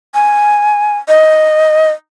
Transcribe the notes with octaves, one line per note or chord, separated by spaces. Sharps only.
G#5
D#5